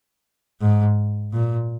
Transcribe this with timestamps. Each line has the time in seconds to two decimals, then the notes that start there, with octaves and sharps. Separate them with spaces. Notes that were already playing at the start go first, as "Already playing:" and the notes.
0.61 G#2
1.33 A#2